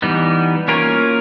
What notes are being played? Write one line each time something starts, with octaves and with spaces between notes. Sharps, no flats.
E3 G3 B3 D#4
A#3 C#4 F4 A#4 C#5